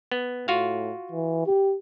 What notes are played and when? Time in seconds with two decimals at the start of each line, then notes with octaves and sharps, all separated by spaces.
0.12 B3
0.48 A2 F4 F#4 F5
1.12 E3
1.46 G4